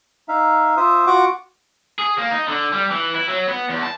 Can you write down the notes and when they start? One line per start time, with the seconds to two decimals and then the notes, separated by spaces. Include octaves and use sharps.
0.28 D#4 E5 F5
0.77 F4 C5 E5 D#6
1.07 F4 F#4 F#5 C#6 D6
1.99 G#4
2.19 A#3
2.31 D#4
2.48 D3
2.72 G3
2.91 E3
3.16 E4
3.29 F#3
3.49 B3
3.70 E2
3.83 A5